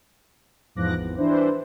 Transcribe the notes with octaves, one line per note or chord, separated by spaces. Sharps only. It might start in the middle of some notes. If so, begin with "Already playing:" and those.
E2 G#2 F3 D6 F#6 A#6
G#1 E2
E3 G3 D4 E4 C5